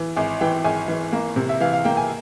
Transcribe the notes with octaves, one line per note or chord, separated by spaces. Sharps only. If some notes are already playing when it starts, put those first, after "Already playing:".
Already playing: E3
G#1 G#5
E3 G5
G#1 G#5
E3
A#3
C3
E5
E3 F5
F5
A#3 G5
G#5